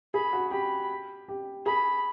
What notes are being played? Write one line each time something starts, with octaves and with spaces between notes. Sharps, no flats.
G#4 B5
F#4
G4 B5
G4
G#4 B5